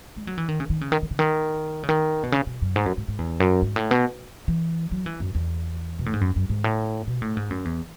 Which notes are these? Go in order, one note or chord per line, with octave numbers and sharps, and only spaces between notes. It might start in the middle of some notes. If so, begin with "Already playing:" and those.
G#3
F#3
E3
D#3
C#3
D#3
C#3
D#3
D#3
C#3
D#3
C#3
D#3
B2
C#3
B2
F#2
G#2
F#2
G#2
G#2
E2
F#2
G#2
A2
B2
E3
F#3
E3
F#2
E2
B2
A2
G#2
F#2
F#2
G#2
A2
B2
A2
G#2
F#2
E2